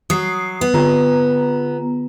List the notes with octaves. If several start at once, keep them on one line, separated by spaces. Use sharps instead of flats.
F#3 D#6 C7
B3
D3 F4 A#5